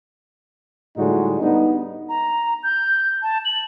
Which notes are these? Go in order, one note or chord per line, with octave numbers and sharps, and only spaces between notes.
A2 D3 G3 G#3 D#4 F#4
G3 B3 D4 D#4
A#5
G6
A5
F#7